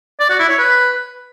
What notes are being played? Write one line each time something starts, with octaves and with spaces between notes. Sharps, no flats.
D5
F#4
E4
C#5
B4